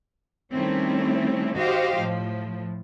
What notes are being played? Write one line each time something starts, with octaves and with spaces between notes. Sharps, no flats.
D#3 G3 A3 C4 C#4 E4
F#4 G4 C5 D#5 F5
A2 F3